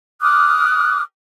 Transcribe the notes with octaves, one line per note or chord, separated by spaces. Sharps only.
D6 D#6 F6 F#6